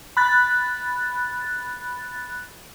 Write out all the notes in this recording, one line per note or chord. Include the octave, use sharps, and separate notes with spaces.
B5 F#6 A6